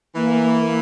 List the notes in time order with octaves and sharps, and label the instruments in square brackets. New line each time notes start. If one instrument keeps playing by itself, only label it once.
[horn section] E3 [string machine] A#3